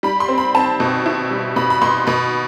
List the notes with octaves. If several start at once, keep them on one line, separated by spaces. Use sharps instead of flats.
G3 B5
C6
C4
B5
C4 A5
B2
E4
G3
B2 B5
B5
B2 C6
B2 B5